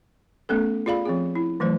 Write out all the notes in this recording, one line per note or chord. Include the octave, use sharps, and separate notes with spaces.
A3 B3 C#4 A4
F4 G#4 D5 F5 B5
F3 C4 G#4
E4
E3 F#3 A3 C5